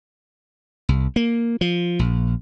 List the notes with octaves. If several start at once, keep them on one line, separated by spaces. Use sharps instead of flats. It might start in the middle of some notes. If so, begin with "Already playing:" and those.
C2
A#3
F3
A#1